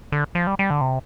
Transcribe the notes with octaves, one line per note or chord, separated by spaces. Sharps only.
D3
F3
G3
G3
D3
C3